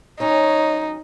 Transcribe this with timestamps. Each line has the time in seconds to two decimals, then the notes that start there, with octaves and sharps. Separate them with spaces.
0.20 F#3 C#4 D#4 C#5